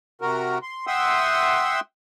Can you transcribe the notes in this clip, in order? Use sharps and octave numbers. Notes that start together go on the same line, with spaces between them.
C3 F#4 A#4
C6
E5 F#5 G5 C6 D#6 E6